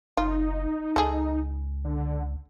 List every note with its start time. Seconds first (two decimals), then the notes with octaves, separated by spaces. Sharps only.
0.17 F#1 D#4 F4
0.96 C#2 G#4 A4
1.84 D3